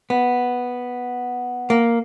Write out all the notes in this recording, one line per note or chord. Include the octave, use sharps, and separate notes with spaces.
B3
A#3